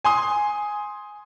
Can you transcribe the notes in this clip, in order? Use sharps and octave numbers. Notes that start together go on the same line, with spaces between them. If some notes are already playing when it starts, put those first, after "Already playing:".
G#5 C6 D#6